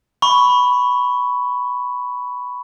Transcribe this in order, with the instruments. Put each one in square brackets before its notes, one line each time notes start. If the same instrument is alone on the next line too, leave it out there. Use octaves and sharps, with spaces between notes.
[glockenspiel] B5 C#6